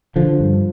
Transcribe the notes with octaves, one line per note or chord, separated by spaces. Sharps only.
D3 F3
G2